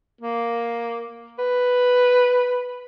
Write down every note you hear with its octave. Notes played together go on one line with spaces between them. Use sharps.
A#3
B4